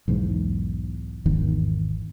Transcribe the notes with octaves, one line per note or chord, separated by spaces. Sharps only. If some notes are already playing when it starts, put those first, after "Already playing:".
B1 E2 G#2
G#1 E2 D#3